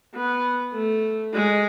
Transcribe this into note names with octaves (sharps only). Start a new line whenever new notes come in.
B3
A3
G#3